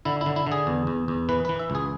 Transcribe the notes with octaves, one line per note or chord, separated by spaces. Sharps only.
D3 E4
E4
D3
E4
D3
G#4
E2
E2
E2
E3 B4
E3 B4
E5
C#2
G#4